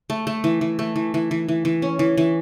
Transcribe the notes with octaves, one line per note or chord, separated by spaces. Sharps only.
A3
A3
E3
E3
A3
E3
E3
E3
E3
E3
C#4
E3
E3